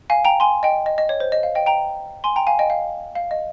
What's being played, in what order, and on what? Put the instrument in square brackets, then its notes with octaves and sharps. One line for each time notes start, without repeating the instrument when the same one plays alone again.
[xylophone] F5 G#5
G5 A#5
G#5 C6
D#5 G5
D#5
D#5
C#5
C5
D#5
F5
D#5 G5
G5 A#5
G#5 C6
G5 A#5
F5 G#5
D#5 G5
F5
F5
D#5